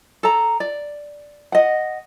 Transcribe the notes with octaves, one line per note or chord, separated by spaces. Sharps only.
A4 A#5
D5
D#5 F#5